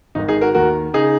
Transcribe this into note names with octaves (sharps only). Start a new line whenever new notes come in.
G#1 G#2 D#3 D#4
D#4 G#4
F#4 A#4
D#2 D#3 F#4 A#4
C#3 D#4 G#4